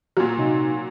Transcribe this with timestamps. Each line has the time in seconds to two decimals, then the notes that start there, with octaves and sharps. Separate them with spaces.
0.17 A#2 F#3 F4 F#4
0.38 C3 A#3 D#4